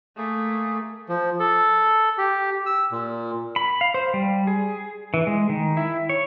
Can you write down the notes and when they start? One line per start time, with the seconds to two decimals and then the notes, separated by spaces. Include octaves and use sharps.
0.17 A3 A#3 G#4
1.09 F3
1.39 A4
2.18 G4
2.66 E6
2.92 A#2
3.56 B5
3.81 F5
3.94 C5
4.14 G3
4.47 G#4
5.14 E3
5.27 G#3
5.49 D#3
5.77 E4
6.09 C#5